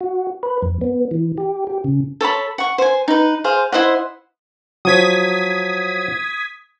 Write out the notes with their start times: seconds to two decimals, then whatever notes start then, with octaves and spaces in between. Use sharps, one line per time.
0.01 F#4
0.43 B4
0.62 F2
0.81 B3
1.11 E3
1.38 G4
1.67 G4
1.84 C#3
2.21 A4 C#5 A5 B5
2.58 F#5 C#6
2.78 C5 G#5
3.08 D#4 B4
3.44 G#4 C5 F5
3.72 E4 C5 D#5 F#5
4.85 F3 F#3 D#6 G#6 B6